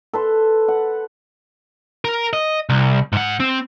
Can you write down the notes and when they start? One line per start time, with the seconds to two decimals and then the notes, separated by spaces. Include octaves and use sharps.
0.13 A4 B4 C6
0.68 F#5
2.05 A#4
2.33 D#5
2.69 C2
3.13 G#2 F#5
3.40 C4